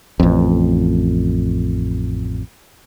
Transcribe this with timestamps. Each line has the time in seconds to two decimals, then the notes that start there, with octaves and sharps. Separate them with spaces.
0.20 A1 F2